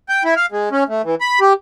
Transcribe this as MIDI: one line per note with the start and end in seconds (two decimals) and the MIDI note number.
0.09 0.23 79
0.25 0.34 64
0.36 0.46 77
0.52 0.69 56
0.72 0.84 61
0.89 1.02 57
1.05 1.15 52
1.21 1.39 83
1.41 1.53 67